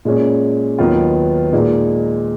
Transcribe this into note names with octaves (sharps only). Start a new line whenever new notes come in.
A#2 G#3 C#4
D#2 D#3 F#3 B3 F4
A#2 G#3 D#4